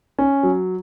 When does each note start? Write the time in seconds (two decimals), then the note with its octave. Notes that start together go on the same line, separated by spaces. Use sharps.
0.19 C#4
0.43 F#3